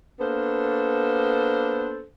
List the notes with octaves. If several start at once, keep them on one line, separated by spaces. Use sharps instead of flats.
A#3 B3 D4 A4 C5